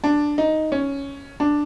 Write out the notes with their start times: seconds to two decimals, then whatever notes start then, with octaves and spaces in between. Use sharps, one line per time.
0.04 D4
0.38 D#4
0.72 C#4
1.40 D4